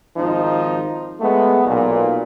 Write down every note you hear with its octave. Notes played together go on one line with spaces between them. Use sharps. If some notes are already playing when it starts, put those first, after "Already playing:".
G#1 F3 D#4
G#3 A3 B3
B1 A#2